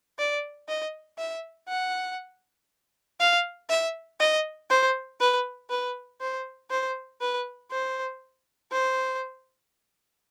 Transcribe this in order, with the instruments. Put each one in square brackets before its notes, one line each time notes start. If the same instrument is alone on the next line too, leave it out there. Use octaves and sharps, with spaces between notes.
[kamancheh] D5
D#5
E5
F#5
F5
E5
D#5
C5
B4
B4
C5
C5
B4
C5
C5